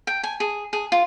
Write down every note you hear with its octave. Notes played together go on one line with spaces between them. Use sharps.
G5
G#5
G#4
G#4
F4